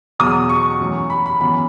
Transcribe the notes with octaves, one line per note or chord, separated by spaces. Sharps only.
E2 B2 F#3 D#6
C#6
F#2 E3 A3
B5
B5
F#2 E3 B3 B5